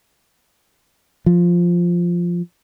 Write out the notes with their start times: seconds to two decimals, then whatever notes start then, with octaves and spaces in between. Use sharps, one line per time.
1.26 F3